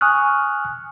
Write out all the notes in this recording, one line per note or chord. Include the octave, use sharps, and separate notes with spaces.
G#5 C#6 D#6 F6 F#6